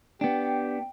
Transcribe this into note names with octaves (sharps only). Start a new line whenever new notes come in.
B3 D4 G4 G5